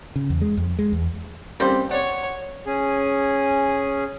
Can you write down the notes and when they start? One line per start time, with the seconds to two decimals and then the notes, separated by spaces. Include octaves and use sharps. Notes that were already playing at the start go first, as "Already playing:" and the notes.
0.16 C#3
0.30 E2
0.42 G#3
0.57 F2
0.79 G#3
0.93 E2
1.60 G3 A#3 C4 C#4 G4 C5
1.91 C#5 D5 F#5
2.66 C#4 G#4